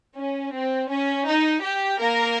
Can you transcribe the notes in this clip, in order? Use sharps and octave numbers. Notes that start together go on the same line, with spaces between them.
C#4
C4
C#4
D#4
G4
A#3 A#4